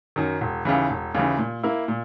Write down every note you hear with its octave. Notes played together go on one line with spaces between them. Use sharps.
F#2 D#3
E1
D#2 C#3 E3
E1
D#2 C#3 E3
A#2
A#3 E4
A#2